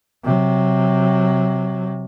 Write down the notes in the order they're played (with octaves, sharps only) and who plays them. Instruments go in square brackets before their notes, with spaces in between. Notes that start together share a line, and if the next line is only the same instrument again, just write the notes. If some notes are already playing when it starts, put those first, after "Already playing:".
[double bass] C3 F#3